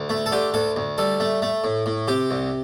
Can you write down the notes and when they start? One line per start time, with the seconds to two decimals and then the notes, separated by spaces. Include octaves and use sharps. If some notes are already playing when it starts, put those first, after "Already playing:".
Already playing: D2
0.09 A3
0.26 A4
0.32 D3 G4
0.54 D2 A4
0.76 D2
0.98 G3 A4
1.20 A3
1.42 A3
1.64 A2
1.86 A2
2.08 C3 G4
2.31 C2